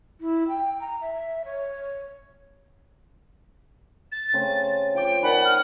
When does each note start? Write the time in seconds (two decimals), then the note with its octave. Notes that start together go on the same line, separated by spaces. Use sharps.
0.20 E4
0.48 G5
0.79 A#5
1.01 E5
1.44 C#5
4.12 A6
4.33 C#3 A3 C4
4.95 F3 G5 D6
5.22 D#3 D5 F#5 G#5 B5
5.43 F6